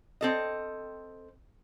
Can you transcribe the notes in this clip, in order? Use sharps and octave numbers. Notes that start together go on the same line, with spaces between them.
C4 A4 D#5